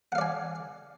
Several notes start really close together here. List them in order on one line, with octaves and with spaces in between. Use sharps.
F#5 F5 D5 G#5